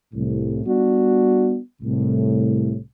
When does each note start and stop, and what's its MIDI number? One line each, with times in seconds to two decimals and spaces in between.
0.13 0.63 36
0.13 0.63 45
0.65 1.56 55
0.65 1.56 59
0.65 1.56 62
0.65 1.56 66
1.82 2.78 36
1.82 2.78 45